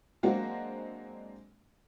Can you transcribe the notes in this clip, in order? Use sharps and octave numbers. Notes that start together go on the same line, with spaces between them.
F#3 G#3 A#3 C4 D4 F#4